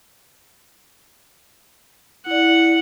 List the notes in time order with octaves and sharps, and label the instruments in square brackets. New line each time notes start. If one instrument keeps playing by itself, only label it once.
[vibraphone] E4 D5 [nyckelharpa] F#5